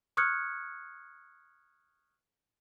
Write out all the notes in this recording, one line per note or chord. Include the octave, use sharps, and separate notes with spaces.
C#6 D#6 F6 F#6 G#6 C#7